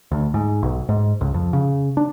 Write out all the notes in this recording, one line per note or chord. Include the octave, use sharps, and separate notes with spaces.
D2
G#2
B1
G#2
C#2
F2
C#3
D4